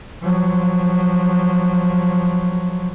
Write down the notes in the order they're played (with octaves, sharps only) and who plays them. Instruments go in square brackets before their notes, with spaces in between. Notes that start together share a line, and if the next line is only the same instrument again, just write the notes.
[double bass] F3 F#3